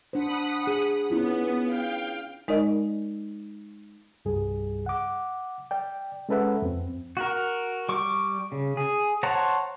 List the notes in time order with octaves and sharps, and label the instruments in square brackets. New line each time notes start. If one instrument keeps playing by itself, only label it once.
[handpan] D4 C5 [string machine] F#5 B5 D#6
[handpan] G#4
[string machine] B3 [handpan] C#4 E4 F4
[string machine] F5 G5
[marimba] G#3 D#4 A#4 D5 D#5
[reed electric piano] C2 G2 G3 G#4
F#5 D6
D5 G5
G#3 C#4 A4 B4 E5 F#5
F2 C4
[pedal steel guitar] F#4 A#4
G3 C#6 D6
C#3
G#4
C5 C#5 F#5 A5 A#5